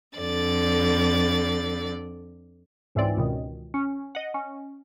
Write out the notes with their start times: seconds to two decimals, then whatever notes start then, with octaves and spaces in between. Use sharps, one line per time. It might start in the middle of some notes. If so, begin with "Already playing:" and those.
0.17 F2 D3 D5 A6
2.95 C#2 G#2 E3 C4 D5
3.17 C#2 B2 D#3
3.74 C#4
4.15 D#5 F#5
4.34 C#4